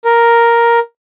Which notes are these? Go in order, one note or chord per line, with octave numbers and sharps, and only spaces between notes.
A#4